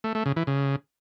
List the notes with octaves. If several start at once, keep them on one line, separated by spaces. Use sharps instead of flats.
A3
A3
C#3
E3
C#3